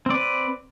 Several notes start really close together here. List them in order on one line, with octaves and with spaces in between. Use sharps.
C4 D5 B4